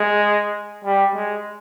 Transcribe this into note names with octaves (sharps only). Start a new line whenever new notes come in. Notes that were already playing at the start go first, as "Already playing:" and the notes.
Already playing: G#3
G3
G#3